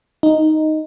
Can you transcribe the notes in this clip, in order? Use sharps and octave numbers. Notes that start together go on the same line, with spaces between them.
D#4